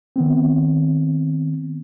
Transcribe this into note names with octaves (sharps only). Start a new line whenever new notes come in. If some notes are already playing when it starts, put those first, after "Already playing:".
D#3 B3 C4